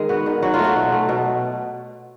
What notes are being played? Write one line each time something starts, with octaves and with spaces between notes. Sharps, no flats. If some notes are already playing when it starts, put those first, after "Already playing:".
Already playing: D#3 G#3
B3 F#4
D#3
F#3 F#4
F4
A3 F#4
B2
A3
B2